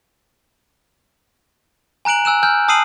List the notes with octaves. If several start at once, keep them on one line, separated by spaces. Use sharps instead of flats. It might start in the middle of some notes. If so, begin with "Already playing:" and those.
G#5 A#5 F#6 D7 F#7
G#5 E6 F#6 E7
G#5 E6 F6 G6
A5 D#6 E6 C7 D#7 F#7